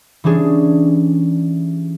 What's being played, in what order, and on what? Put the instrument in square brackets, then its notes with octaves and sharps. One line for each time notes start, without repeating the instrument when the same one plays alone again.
[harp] E3 G3 C#4 D4 G#4